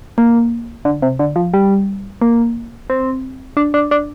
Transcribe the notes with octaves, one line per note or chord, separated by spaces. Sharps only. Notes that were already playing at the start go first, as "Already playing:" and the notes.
A#3
D3
C3
D3
F3
G3
A#3
C4
D4
D4
D4